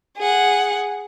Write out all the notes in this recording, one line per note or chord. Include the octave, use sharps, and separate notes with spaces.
G#4 F#5